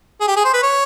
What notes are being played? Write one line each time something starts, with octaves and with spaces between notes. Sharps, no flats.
G#4
G4
G#4
C5
B4
C#5